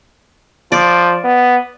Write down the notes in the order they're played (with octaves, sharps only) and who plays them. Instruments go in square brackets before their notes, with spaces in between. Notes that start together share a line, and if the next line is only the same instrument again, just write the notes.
[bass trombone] F3 [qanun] D5
[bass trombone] B3